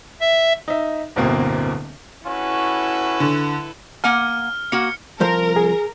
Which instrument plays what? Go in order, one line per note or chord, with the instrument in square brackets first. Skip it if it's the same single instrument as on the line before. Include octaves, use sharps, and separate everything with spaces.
[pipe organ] E5
[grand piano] D#4 E5
D1 G1 D2 B2 A#3 C4
[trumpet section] C#4 F#4 [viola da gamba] E4 A4 B4
[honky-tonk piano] D3
[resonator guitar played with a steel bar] A#3 F#5 G#5 [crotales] F6
[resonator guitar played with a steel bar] A#3 F#4 F#5 [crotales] C#7
[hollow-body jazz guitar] C2 F3 C5 [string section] A#4
[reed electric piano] G#4